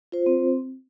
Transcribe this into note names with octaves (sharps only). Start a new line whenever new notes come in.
F4 C5
C4